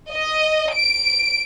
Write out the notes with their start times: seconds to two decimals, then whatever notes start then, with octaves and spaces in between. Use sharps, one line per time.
0.12 D#5
0.73 D7